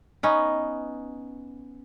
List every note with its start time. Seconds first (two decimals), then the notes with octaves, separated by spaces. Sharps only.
0.23 B3 C#4 D#4